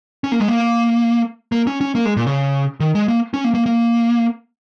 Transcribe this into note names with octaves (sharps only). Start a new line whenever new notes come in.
C#4
A#3
G#3
A#3
A#3
C#4
C#4
A#3
G#3
A#2
C#3
D#3
G#3
A#3
C#4
A#3
A#3
A#3